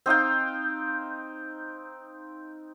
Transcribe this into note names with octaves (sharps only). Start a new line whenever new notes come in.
C4 D#4 F5 G5